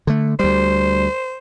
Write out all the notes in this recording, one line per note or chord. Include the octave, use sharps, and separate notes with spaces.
D3 A3
D2 G3 C5